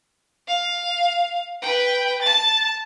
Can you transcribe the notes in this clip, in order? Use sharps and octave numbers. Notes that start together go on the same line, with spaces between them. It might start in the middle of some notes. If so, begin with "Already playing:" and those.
F5
B4 G5
A5 A6